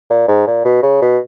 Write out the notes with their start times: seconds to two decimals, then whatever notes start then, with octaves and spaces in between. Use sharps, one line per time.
0.10 A#2
0.28 G#2
0.47 A#2
0.64 B2
0.82 C#3
1.01 B2